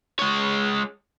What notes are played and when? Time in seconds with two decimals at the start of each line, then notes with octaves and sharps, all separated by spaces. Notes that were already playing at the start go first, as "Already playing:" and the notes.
0.19 G#3 C#5